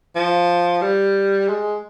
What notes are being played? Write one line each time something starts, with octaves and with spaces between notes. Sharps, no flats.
F3
G3
G#3